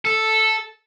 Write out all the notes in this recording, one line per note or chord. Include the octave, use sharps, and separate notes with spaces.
A4